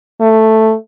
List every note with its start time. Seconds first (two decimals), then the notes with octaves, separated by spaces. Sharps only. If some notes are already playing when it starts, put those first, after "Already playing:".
0.21 A3